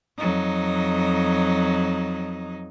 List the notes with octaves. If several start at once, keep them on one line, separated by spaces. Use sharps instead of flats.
F2 F#3 D#4